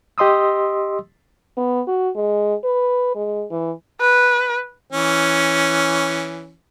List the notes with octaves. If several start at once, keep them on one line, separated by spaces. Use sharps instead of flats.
G4 D#5 C6 D#6 E6
B3
F#4
G#3
B4
G#3
E3
B4
E3 C#4